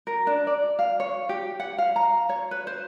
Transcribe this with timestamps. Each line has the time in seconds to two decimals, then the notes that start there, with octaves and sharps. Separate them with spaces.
0.07 A#4
0.27 D4
0.47 D5
0.79 F5
1.00 C#5
1.29 G4
1.60 F#5
1.78 F5
1.96 A#5
2.29 C#5
2.51 B4
2.67 C5